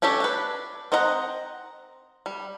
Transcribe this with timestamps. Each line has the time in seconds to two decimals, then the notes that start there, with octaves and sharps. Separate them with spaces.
0.02 C#4 D4 G4 A4 C#5
0.20 D4 B4
0.92 C4 C5 D#5 F#5 A#5
2.26 G3